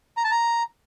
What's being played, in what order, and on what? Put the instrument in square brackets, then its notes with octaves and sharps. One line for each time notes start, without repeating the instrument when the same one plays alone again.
[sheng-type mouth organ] A#5
A5
A#5